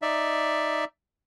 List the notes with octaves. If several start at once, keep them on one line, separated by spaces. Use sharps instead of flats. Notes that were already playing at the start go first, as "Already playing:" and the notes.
D#4 D5 E5